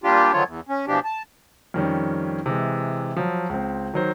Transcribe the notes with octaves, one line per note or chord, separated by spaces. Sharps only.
A#2 G3 D4 F4 G4
D3 D#3 F3 F#3 F4 C#5
E2
C#4
B2 E3 F3 D4 G4
A5
F2 D#3 G3 C#4
C3 E3 G#3
F3 F#3
C#2 C4
D#3 F#3 C5